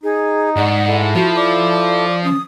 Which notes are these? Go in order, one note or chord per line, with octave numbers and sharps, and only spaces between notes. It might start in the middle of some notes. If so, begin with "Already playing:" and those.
D#4 G#4
G#2 D5 F#5
E4 A4
F3 F#4
D5 D6
C#4 D#6